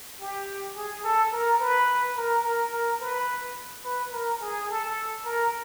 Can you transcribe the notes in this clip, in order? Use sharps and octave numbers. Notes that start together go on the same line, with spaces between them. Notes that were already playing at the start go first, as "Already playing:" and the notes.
G4
G#4
A4
A#4
B4
A#4
A#4
A#4
B4
B4
A#4
G#4
A4
A#4